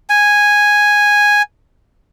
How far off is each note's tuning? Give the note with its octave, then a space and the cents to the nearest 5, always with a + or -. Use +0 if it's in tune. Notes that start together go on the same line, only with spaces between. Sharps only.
G#5 -5